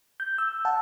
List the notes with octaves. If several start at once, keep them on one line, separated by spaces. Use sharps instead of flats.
G6
E6
F#5 A5